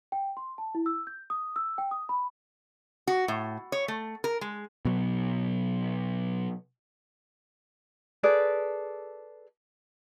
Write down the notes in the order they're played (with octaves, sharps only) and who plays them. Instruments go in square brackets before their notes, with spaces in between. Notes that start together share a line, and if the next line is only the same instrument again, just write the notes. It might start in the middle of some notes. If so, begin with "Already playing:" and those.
[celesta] G5
C6
A5
E4
E6
G6
D#6
E6
G5
D#6
B5
[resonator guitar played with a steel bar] F#4
A2
C#5
A3
A#4
G#3
[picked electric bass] B2 F#3
[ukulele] G#4 A4 B4 D5